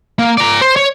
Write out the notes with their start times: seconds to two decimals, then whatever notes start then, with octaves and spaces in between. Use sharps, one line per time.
0.19 A#3
0.37 D5 A#5
0.61 C5
0.76 C#5